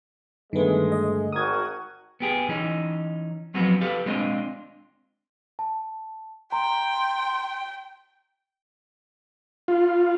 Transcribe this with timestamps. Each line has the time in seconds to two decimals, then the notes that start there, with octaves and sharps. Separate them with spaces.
0.53 G2 D3 D#3 G#3 A3 B3
0.92 D#5
1.32 G#1 F#4 A#4 D#6 G#6
2.20 B3 G4 G#4
2.48 E3 C#4 D#4
3.54 F3 F#3 B3 C4 F#4
3.81 G4 A4 B4 F5
4.06 G#3 C4 D4 F4 C5 D#5
5.59 A5
6.52 G5 A#5 C6
9.68 F4